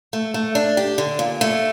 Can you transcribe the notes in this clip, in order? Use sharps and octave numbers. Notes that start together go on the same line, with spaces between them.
A3
A3
D4
G4
D3
A#2
A3